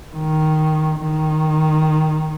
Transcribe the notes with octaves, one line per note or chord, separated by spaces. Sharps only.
D#3
D#3